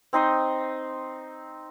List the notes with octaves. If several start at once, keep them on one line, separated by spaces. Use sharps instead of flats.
C4 D#4 C6 D#6